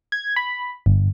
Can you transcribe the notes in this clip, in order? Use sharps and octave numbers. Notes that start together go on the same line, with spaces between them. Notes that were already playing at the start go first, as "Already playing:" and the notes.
G#6
B5
G1